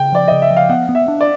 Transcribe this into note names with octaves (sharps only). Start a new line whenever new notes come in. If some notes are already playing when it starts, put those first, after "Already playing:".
Already playing: C#3 G5
F3 D5
C#3 D#5
E5
F3
F5
B3 F#5
B3
E5
D4
D5